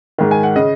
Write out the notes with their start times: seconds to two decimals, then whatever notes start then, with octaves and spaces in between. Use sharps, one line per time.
0.18 G#2 D#3
0.31 G#5
0.43 F#5
0.56 C#3 D#5